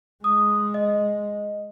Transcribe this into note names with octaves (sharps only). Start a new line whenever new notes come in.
G#3 D#6
D#5